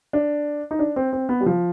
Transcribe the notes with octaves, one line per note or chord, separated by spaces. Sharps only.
D4
D#4
D4
C4
C4
B3
G3
F3